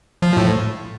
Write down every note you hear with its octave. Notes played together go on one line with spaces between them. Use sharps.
F3
A2